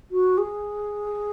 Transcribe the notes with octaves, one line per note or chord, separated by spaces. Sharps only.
F#4
G#4